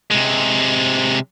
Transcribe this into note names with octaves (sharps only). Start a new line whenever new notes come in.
C3 G#3